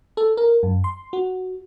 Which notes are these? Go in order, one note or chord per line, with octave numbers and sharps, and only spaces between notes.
A4
A#4
F#2
C6
F#4